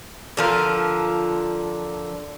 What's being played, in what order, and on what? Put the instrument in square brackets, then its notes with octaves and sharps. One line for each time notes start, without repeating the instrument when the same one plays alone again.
[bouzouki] D3 F3 A#4